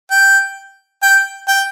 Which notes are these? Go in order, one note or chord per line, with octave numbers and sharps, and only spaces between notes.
G5
G5
G5